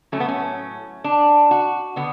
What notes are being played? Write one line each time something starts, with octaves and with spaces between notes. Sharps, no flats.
A2 F#3 A3 C#4
B3
C#4
D4
F#4
D3 B3